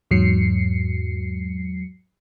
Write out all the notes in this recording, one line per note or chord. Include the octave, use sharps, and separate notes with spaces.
E2 G#2 F#3 C7 C#7